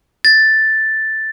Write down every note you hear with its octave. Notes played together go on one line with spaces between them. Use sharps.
A6